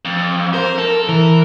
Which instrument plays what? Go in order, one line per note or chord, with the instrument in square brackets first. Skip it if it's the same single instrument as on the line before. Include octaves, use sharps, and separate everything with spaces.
[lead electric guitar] F2
[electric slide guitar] A#4 [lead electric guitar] C5
[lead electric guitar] A4
[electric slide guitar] E3 [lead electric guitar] A#4